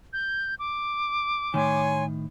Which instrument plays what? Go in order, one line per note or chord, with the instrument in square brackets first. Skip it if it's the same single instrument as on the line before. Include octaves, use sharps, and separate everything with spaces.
[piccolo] G6
D6
[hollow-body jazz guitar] A2 D#3 [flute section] C#5 G#5 C6